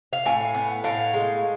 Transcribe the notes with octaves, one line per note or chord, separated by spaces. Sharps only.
F5
A2 G#5
B3
A2 F5
G#3